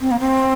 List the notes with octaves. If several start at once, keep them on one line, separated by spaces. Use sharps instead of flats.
C4
A#3
C4